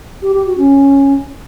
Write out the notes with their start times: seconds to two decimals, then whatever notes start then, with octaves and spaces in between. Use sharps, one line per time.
0.22 G4
0.34 G4
0.46 F#4
0.58 C#4